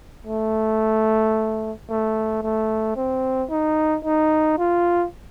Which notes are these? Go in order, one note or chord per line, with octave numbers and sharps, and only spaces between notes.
A3
A3
A3
C4
D#4
D#4
F4